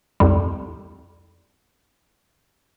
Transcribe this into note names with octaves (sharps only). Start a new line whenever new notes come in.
C2 F2 G3